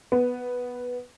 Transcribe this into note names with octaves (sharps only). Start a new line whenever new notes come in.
B3